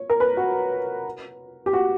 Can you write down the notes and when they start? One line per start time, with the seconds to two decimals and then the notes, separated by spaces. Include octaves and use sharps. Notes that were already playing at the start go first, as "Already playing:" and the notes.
Already playing: C#5
0.10 A#4
0.20 B4
0.37 F#4
1.66 G4
1.73 F#4